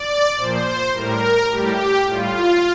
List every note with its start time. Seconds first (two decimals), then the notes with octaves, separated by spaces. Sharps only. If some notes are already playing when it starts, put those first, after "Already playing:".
Already playing: D5
0.37 A#2 F3 C5
0.94 A2 G3 A#4
1.50 A2 G3 G4
2.06 A2 G3 F4